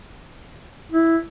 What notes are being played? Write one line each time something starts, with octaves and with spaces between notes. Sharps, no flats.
E4